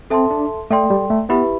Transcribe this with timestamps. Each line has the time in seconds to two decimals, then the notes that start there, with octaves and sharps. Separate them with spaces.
0.10 C4 A4 E5 A5 C6
0.31 D4
0.71 A3 A4 D5 G5 C6
0.90 G3
1.10 A3
1.29 B3 E4 G4 B4 E5 B5